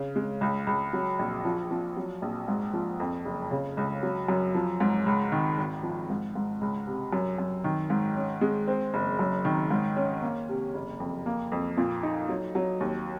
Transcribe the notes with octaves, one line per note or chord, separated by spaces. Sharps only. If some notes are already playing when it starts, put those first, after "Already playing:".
Already playing: C#3
G#3
C#2
C#2
F#3
A#1
F3
F3
F#3
A#1
G#2
F3
F2
F#1
C#3
C#2
F#3
F#2
F3
G#2
C#2
D#3
G#1
F3
G#2
G#2
C#2
C3
F#2
F#2
D#3
G#2
C#4
G#3
C4
F#1
F#2
D#3
G#2
C#4
A#3
C3
F#1
F2
A#3
F2
A#2
D#4
F#3
F#3
D#2